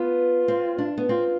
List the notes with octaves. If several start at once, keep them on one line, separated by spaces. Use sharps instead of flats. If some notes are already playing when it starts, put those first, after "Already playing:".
Already playing: B3 F4
C4
D4
B3
C4 F4